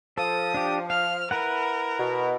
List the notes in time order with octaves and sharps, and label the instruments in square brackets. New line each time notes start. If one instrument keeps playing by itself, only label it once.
[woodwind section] F3 [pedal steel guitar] A4 [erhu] D#6
[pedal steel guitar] D4 G4
[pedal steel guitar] F5 [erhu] F6
[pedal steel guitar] E4 B4 F#5 [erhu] A#4
[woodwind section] B2